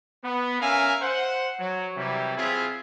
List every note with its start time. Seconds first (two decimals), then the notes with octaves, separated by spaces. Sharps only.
0.24 B3
0.61 C#4 A#4 E5 F5 G#5
1.02 C5 F#5
1.60 F#3
1.97 C3 E3 F#3 G3
2.37 C4 E4 F4 G#4 E5